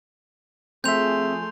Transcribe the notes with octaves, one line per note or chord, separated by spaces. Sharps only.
F3 A3 C4 G#4 E5 C6 G6 F7